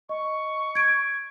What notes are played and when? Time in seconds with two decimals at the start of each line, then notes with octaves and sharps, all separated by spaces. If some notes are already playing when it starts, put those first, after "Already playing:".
0.09 D#5 C#6
0.75 G#6 D7